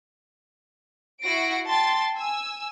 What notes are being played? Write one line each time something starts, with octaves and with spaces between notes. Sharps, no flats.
E4 F#4 F#5 A#6 C7 D7
G5 A5 C6 A6
G#5 E6